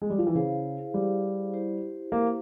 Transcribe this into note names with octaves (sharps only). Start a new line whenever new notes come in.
G#3
G3
F3
E3
C#3 E4 G#4 C5 F5
G3
E4 G4 C5
A#3